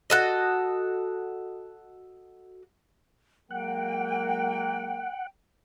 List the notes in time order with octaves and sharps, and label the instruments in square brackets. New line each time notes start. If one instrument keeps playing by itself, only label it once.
[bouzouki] F#4 A4 D#5
[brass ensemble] F#3 G#3 A#3 [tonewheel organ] F#5 [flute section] G5